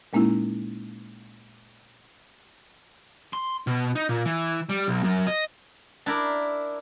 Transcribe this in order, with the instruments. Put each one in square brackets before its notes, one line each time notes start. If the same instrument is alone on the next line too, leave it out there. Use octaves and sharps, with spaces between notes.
[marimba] A#2 G#3 A#3 C#4 D#4 E4
[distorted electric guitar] C6
B2
D#4
A#2
E3
G3
B1
F#2
D#5
[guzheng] D4 E4 A#4